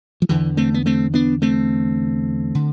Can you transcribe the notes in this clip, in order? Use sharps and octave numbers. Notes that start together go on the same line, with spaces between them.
F3
E2 D3 E3
A3 C4
B3
A3 C4
B3 D4
A3 C4
D3